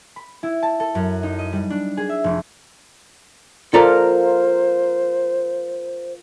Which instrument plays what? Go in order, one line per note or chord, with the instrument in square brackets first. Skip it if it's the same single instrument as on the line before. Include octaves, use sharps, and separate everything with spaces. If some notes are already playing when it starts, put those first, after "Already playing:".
[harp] B5
E4
A5
A4
F#2
D#4
D#5
G3
D4
G#4
E5
F1
[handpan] F4 A#4 [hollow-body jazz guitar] A4 D5 A#5 [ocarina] C5